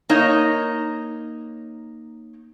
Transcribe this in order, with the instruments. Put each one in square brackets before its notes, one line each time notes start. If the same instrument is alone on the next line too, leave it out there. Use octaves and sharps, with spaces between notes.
[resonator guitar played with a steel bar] A#3 D#4 C#5 D#5